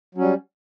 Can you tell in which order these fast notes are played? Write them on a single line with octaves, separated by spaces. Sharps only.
F#3 C#4 G3